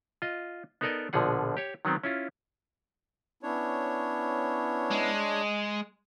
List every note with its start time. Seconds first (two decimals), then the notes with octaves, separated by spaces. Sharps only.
0.22 F4 D#5
0.81 B3 D#4 A4 A#4 D5 D#5
1.13 A#1 B2 D3 F3 G#4 F#5
1.57 G4 C#5
1.85 D#3 F#3 B3 C4
2.04 C#4 E4 F4
3.43 B3 C#4 D4 E4 C#5
4.91 G#3